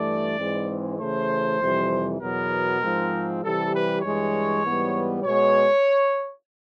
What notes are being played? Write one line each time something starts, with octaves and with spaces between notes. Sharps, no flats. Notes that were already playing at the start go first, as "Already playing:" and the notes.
Already playing: G2 E3 A3 D5
G#2 E3 G#3 C4
C#3 E3 A3 C5
F2 C3 E3 G3
E2 B2 F#3 B3 A#4
G#2 F3 G#3 C4
C3 E3 G3 A4
B4
G2 E3 G#3 C#5
G#2 E3 G3 B3
B2 G#3 B3 C#5